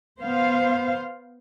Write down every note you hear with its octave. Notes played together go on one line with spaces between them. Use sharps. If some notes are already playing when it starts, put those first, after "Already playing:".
B3 C5 F5